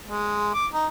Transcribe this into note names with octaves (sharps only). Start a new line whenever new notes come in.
G#3
D6
D#4